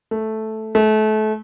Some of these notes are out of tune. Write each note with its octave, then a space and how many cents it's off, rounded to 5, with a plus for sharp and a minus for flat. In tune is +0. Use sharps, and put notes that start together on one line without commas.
A3 -5
A3 -30